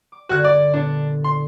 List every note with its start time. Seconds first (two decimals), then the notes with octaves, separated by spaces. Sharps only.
0.12 D6
0.29 G1 D3 F#4 F#6 G#6
0.44 D5
0.74 A#2 B3 D4 A6
1.24 C6